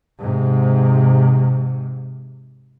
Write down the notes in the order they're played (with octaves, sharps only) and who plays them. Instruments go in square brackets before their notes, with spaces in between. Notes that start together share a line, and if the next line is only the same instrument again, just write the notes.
[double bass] G#2 C3